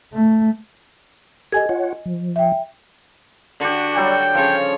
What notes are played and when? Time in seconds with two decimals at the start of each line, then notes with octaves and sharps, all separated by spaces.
0.13 A3
1.52 G4 A4 D#5 G#5 G#6
1.69 F4 C#5 F#5
2.06 F3
2.36 E5 G5
3.60 D3 D4 F#4 G4
3.96 F#3 G3 A4 G5
4.34 C#3 F3 C#5